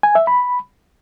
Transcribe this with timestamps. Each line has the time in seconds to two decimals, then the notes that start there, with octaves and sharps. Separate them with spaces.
0.03 G#5
0.15 E5
0.27 B5